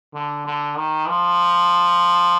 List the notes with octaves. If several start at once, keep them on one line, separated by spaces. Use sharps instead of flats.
D3
D3
D#3
F3